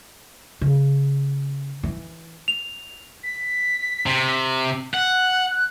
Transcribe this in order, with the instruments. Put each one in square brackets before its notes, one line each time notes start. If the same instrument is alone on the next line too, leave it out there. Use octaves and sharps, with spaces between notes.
[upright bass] C#3
E3
[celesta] F7
[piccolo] B6
[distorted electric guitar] C3
[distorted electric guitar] F#5 [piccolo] F#6
[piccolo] F#6